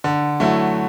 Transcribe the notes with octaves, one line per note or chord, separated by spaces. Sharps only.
D3
F#3 A3 E4